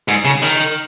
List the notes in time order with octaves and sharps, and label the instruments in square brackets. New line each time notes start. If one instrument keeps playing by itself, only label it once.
[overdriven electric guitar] G#2
C#3
D#3